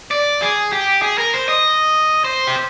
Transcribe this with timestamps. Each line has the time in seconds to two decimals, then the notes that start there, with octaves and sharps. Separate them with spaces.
0.11 D5
0.42 G#4
0.73 G4
1.02 G#4
1.18 A#4
1.34 C5
1.49 D#5
2.24 C5
2.47 G4